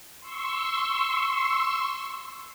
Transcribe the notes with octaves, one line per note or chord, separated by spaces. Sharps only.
C6 C#6 E6